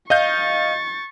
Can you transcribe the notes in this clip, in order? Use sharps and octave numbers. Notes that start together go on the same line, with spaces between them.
D#5 F5 C#6 G6 A6